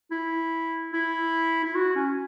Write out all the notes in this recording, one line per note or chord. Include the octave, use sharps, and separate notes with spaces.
E4
E4
E4
F#4
C#4